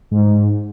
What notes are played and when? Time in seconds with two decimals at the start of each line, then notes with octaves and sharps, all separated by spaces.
0.11 G#2